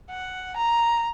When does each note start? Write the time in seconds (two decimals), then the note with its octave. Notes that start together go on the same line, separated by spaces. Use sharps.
0.10 F#5
0.56 A#5